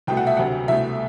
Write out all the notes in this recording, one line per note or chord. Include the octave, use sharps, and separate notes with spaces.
C2 B2 A3 G5
F#5
E5
D2 C3 F#3 F#5
C2 B2 A3 E5